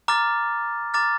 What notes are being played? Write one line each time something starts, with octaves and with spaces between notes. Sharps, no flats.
A#5 D6 F6 A6
A#5 D6 F6 A6